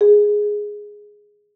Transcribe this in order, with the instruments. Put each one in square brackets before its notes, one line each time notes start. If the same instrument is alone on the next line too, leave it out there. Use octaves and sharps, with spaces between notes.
[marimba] G#4